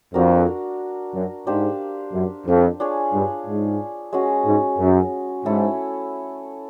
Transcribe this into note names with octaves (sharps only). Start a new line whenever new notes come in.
F2 D4 F#4 A#4
F#2
G#2 D4 G4 C5 F5
F#2
F2
D4 F4 G#4 C#5
G2
G#2
G#3 C#4 F#4
G#2
F#2
G#2 A3 C#4 E4 A4